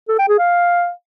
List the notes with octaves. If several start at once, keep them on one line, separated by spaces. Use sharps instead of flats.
A4
G5
G#4
F5